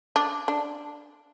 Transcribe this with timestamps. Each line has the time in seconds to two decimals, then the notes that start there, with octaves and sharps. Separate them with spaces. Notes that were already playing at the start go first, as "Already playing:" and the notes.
0.16 D4
0.48 D4